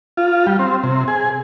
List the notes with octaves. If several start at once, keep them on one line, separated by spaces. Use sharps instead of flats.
F4
G3
C4
C3
G#4